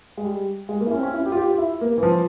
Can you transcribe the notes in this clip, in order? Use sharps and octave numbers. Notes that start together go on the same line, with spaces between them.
G#3
G3
G#3
A#3
E4
C#4
C4
C#4
E4
G4
F4
G4
F4
E4
A#3
E3
F3